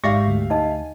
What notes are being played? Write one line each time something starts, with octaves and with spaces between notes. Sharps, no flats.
G#1 G#2 G4 D5 E5 F5 C#6 A#6
D2
D#4 D#5 G#5 A5